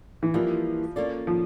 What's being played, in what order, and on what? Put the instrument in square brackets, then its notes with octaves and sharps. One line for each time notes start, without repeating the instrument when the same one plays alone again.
[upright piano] E3
[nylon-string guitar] E3 G3 A#3 [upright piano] F3
[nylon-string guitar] A#3 C#4 F4 A4 D5
[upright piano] F3